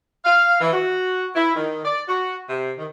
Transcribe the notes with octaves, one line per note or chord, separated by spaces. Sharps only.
F5
E3
F#4
E4
D#3
D5
F#4
C3
D#3